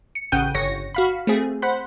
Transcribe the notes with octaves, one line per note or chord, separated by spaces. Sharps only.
C#7
A1 C#3 F#5 G5 G6 D#7
G1 C#5 A#6 C#7
F#4 F5 B5
A3 C4 G#4
C5 F#5 B5